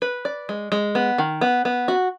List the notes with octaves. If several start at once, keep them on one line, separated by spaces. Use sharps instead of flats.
B4
D5
G#3
G#3
B3
D#3
B3
B3
F#4